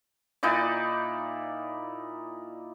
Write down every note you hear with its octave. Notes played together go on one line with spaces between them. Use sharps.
A#2 D#4 E4 D5